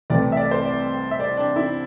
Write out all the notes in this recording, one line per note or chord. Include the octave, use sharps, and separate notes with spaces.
C2 C3 E3 A3 C4 D5
E5
D5
C5
D5
E5
D5
D4
E4